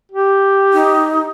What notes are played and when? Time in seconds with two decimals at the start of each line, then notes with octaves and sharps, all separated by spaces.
0.12 G4
0.73 D#4